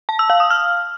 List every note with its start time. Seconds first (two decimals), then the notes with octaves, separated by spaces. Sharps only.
0.09 A5
0.19 E6
0.30 F5
0.40 D#6
0.50 F6